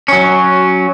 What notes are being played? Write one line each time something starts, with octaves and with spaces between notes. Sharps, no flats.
F#3 C#4